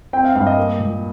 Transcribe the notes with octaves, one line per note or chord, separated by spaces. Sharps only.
C4 G5
F5
G2 F5
D#5
A#3
A#2